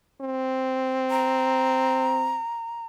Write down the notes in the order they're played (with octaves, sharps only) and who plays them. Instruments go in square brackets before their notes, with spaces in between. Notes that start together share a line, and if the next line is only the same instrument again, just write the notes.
[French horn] C4
[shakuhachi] A#5